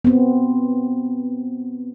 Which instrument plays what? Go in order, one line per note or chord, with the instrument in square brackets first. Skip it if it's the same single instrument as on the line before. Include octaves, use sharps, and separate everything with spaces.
[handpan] B3 C4